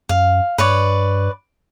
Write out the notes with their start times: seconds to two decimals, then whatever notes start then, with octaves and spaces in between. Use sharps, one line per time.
0.09 F#2 F5
0.58 G2 B4 C#5 D5